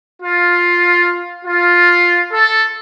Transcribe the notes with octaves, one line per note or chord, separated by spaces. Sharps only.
F4
F4
A4